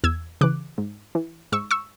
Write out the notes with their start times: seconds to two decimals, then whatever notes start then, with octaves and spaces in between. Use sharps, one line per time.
0.04 E2 E6 G#6
0.41 C#3 E3 D6 F#6
0.78 G#2
1.15 E3
1.52 G#2 C#6 E6
1.71 C#6 E6